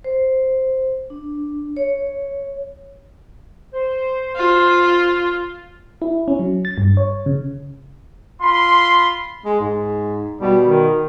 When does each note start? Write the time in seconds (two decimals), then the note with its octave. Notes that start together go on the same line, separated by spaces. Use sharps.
0.04 C5
1.10 D4
1.77 C#5
3.74 C5
4.36 F4
6.02 E4
6.28 C#4
6.39 F#3
6.65 A6
6.78 G2
6.97 C#5
7.26 C#3
8.42 F4 B5 C6
9.45 G#3
9.60 G#2
10.41 B2 G3
10.63 D#3